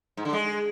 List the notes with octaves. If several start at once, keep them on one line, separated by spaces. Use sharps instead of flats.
G#2
D3
G#3